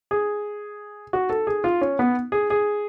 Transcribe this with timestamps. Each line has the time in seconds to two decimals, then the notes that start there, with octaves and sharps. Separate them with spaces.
0.11 G#4
1.13 F#4
1.30 A4
1.47 G#4
1.64 F4
1.81 C#4
1.99 B3
2.32 G#4
2.50 G#4